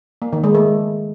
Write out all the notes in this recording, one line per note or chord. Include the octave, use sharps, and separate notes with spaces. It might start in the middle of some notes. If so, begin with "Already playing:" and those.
A#3
D#3
G#3
A3